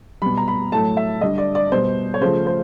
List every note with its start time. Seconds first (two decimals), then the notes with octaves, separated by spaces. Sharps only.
0.22 B2 G3 B5
0.37 A#5
0.48 B5
0.72 A2 F#3 A3 A5
0.97 E5
1.21 D3 G3 D#5
1.38 D5
1.55 D5
1.72 B2 G3 C5
2.14 C#5
2.21 C#3 F3 A3 C5
2.47 C5